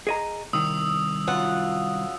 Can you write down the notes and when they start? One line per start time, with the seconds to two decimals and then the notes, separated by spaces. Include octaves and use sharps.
0.07 G#4 D#5 A#5
0.53 C2 D#3 D#6 E6
1.27 F#2 F4 F#5